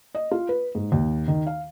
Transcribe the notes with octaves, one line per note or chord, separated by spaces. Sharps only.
D#5
F4
B4
G#2
D#2
D#3
F5